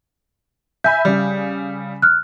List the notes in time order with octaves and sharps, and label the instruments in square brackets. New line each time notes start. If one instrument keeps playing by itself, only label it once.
[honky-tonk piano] E5 G#5 B5 [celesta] G6
[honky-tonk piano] C#3 G3
[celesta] F6 F#6